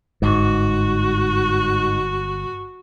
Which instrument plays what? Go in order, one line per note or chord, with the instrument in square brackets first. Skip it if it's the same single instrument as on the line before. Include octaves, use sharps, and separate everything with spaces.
[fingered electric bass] G1 [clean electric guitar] G#2 [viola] F#4